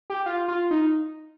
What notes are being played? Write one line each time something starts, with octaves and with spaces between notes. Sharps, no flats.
G4
F4
F4
D#4